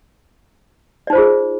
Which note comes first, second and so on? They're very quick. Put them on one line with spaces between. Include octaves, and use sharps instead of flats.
D5 D#4 C5 F4 G#4